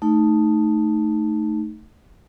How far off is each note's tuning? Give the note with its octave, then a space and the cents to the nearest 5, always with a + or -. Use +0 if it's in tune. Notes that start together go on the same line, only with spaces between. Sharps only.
A3 +0 D#4 +0